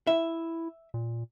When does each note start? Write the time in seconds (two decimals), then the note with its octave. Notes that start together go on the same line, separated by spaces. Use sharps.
0.07 E4 E5
0.94 A#2